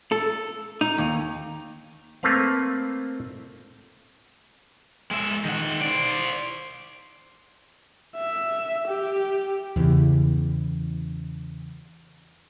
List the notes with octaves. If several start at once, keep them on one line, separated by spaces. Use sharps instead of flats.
A4
D#4
D#2
A3 A#3 C4 B4 F5
G#3 E5
D#3 F#5
C5 D5
E5
G4
E2 C#3